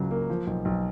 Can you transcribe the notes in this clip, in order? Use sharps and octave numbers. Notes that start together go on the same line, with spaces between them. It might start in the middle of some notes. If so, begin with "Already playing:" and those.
Already playing: C#2 C#3 F#3
A#3
F3
B1
B1